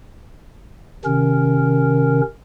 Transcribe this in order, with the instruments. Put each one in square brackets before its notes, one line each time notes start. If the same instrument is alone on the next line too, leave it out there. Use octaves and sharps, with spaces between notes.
[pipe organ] C3 D#3 C#4 A#4